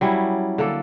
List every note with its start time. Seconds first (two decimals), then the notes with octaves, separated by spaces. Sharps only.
0.01 F#3 G3 C#4 E4
0.58 D3 A#3 A4